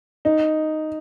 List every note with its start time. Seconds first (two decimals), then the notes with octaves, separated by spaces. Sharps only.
0.25 D#4